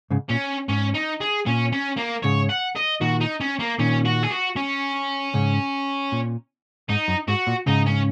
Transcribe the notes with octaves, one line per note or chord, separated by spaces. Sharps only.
G#2 C#3
A#2 C#4
G#2 C#4
D#4
G#4
A#2 C#4
C#4
A#3
G#2 C#3 C#5
F#5
D#5
A#2 D#3 F#4
D#4
C#4
A#3
A#2 D#3 C#4
F#4
G#4
F#4
C#4
G#2 C#3
A#2
G#2 D#4
F#2
G#2 F#4
A#2
G#2 C#3 D#4
C#4